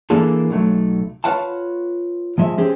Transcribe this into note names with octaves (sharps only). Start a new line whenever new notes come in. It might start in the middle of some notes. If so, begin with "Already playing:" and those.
E3 A#3 D4 G#4 A4
B1 F#3 A3
F4 B4 C#5 F5 F#5 A5
F3 G#3 E5
C4 C#4 G4 G#4